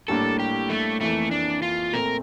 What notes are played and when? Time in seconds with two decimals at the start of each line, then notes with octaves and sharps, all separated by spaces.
0.08 A2 G3 A#3 D4 A4
0.39 G4
0.70 A3
1.01 F2 E3 A3 A#3
1.31 D4
1.62 F4
1.93 A#2 A3 C4 A#4